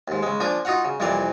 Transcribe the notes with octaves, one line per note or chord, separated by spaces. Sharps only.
D#2 G#2
C#3 G#3
F3 A#3 D4 G#5 D6
D#4 F4 F#4 F5 F#5
C#3
C2 F2 A#2 E3 D5 F5